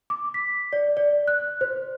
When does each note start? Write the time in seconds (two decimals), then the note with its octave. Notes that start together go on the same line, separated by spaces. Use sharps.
0.10 D6
0.34 B6
0.73 D5
0.97 D5
1.28 F#6
1.61 C5